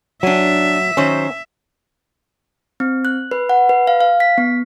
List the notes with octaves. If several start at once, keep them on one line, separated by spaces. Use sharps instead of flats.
F#3 D4 E5 G#5
D#3 F#3 C#4 C5
C4
F#6
B4
F#5
B4
F5
F5
B6
B3